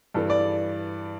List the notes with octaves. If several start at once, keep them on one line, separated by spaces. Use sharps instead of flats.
G2 E3 A4
D5